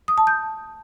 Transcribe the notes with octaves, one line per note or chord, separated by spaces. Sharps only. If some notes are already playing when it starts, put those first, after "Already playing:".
D#6
A5
G6